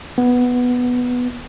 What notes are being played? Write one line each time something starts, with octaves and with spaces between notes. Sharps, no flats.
B3